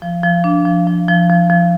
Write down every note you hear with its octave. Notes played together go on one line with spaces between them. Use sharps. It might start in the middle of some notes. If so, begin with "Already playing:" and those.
F3
F3
D4
F3
F3
F3
F3
F3